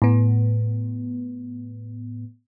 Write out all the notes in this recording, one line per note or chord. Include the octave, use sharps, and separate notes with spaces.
A2 B3